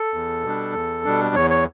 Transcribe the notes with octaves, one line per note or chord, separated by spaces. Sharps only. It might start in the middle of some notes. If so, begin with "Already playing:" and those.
Already playing: A4
E2
B2 G3 D4
E2
B2 G3 D4
E2 C#5
C#5